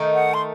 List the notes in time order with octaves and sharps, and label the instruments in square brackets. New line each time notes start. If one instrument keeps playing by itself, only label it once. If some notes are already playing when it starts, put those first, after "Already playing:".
Already playing: [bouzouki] D#3 A3 D#4
[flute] F#5
C6